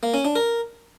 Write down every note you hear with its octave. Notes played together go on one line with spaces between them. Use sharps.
A#3
C#4
D4
A#4